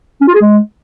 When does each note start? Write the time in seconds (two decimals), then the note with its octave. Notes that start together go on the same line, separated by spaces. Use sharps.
0.21 C#4
0.28 F4
0.34 G#4
0.41 G#3